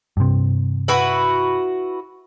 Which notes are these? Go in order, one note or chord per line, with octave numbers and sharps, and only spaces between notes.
G2 C3
E4 F#4 B4